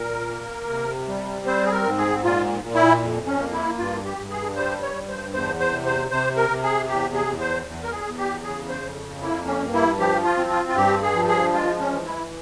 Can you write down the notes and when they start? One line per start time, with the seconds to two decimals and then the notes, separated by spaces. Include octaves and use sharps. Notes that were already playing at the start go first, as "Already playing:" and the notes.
Already playing: A#2 A#4
0.30 A#3
0.69 C3
1.08 G3
1.46 C4 C5
1.65 G#4
1.72 A#4
1.85 G#2
1.98 G#4
2.24 A#2 F4
2.62 A#2
2.75 E4
3.01 F2
3.26 C#4
3.39 A#3
3.52 E4
3.79 G2 F4
4.05 G4
4.17 G2
4.30 G#4
4.56 G3 C5
4.82 C#5
4.95 G2
5.08 C5
5.33 E2 C5
5.59 C5
5.72 C3
5.86 C5
6.11 C3 C5
6.36 A#4
6.50 C3
6.63 G#4
6.88 E2 G4
7.14 G#4
7.27 E2
7.40 C5
7.66 E2
7.83 A#4
7.92 G#4
8.05 E2
8.18 G4
8.43 C#3 G#4
8.69 C5
8.82 F2
9.21 A#3 E4
9.46 C#4
9.61 G2
9.73 E4
9.99 F3 G4
10.24 F4
10.37 C4
10.50 F4
10.69 F4
10.76 G2 G4
11.03 G#4
11.15 F3
11.28 G#4
11.53 G#3 F4
11.80 C#4
11.93 E3
12.05 E4